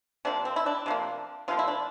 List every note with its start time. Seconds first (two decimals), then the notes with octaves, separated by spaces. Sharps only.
0.25 C3 F3 A#3 D4
0.45 C4
0.56 E4
0.66 D4
0.86 C3 F3 A#3
1.48 C3 F3 A#3 F4
1.59 E4
1.68 D4